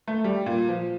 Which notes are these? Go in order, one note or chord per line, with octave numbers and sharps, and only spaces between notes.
A3
G3
A#2
F3